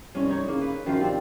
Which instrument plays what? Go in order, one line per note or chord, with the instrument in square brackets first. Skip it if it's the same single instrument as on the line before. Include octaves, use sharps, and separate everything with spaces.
[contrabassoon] C2 [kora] C#4
[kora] D#4 C#5
[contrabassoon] C#3 [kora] A#3
[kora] B4
[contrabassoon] F#2 [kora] D#3 F3 F4
[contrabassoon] C3 [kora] C4 D4